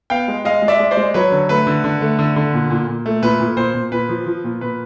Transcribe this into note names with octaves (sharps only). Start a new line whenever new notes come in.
B3 F5 G5
G#3
G#3 D#5 F5
G#3
D5 E5
G#3
C5 D5
G#3
F#3 B4 C#5
D3
A3 B4
D3
D3
A3
D3
D3
A#2
A#2
A#2
A3
A#2 B4
A#2
A#2 C5
A#2
A#2 B4
F3
F3
A#2
A#2 B4